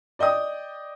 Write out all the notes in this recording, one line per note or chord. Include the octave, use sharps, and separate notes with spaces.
D5 D#5 G5 D#6